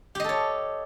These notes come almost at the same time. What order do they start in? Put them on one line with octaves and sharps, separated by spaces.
G4 D#5 A4 C#5